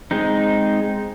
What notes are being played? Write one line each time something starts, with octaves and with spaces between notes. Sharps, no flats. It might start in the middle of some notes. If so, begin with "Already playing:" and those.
G#3 C4 D#4